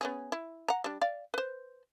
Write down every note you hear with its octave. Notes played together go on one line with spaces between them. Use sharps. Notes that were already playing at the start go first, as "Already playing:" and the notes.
B3 C#4 G#4
E4
F#5 A#5
G3 D4
D5 F5
B4 C5